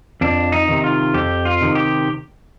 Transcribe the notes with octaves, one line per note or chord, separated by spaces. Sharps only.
F2 D4
D#4
C3 D#3
F4
F2 G4
F4
C3 D#3
G4